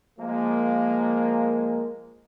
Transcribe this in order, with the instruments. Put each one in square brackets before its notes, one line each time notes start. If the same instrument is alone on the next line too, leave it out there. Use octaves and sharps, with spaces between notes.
[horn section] F3 G#3 A#3